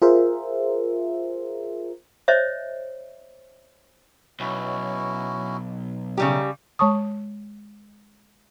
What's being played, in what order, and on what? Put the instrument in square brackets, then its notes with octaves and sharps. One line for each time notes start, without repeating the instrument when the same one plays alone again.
[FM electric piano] F4 G#4 A#4 C5 E5
[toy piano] C5 C#5 D#5 E5
[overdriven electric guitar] B1 [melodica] C#4 E4 F#4
[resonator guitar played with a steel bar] C#3 G3 G4 [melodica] A3 C#4 D#4
[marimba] G#3 C#5 A5 C#6 D#6